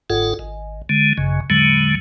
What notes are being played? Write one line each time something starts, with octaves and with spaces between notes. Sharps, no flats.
G1 G#2 F4 A4 F#5
G#1
D3 G#3
G#1 F#2 C#3
E2 A2 D3 F#3 G#3